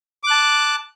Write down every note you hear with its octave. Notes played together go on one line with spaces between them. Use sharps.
A5 D6 F#6